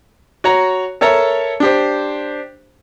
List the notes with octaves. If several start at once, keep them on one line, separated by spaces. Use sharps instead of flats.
F#4 C#5 A#5
A4 A#4 C#5 E5 A5 A#5
D4 G4 C5